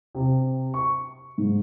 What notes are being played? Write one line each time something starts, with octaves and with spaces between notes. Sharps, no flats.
C3
C#6
G#2